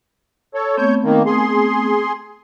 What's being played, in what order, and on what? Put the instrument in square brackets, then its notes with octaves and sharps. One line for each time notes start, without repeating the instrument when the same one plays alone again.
[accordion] A4 C#5
[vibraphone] A3 B3 C4 [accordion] C#5 G6
[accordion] D#3 A#3
G#4 C6